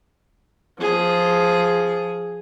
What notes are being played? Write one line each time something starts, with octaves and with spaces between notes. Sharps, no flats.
F3 G#4